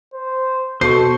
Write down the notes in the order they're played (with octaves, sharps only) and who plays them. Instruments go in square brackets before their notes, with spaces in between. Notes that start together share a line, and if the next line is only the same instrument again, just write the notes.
[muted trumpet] C5
[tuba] B2 [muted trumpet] A4 [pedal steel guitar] C5 C#6 [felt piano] C7